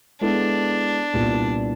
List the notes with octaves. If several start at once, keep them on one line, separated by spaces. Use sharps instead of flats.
G#3 B3 D4 E4 A4
C2 A#2 G3 B3 E4